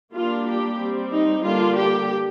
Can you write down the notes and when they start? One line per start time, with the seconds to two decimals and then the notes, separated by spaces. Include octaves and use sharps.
0.13 G3 A#3 D4 F4
0.47 G4
0.79 G3 C4
1.11 D#4
1.43 D3 G3 A#3 D4 F4
1.76 G4